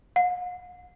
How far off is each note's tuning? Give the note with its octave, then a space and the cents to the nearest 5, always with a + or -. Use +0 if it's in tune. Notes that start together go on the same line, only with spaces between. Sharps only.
F#5 -45